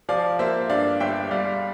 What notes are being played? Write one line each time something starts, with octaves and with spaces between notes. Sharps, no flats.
F3 D5 F5
A#3 C5 E5
G2 D5 F5
G1 E5 G5
G3 D5 F5